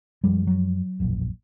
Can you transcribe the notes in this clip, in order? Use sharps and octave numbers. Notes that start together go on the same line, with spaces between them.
F#2 F3 G3 G#3
F#3
E1 A#1 F#2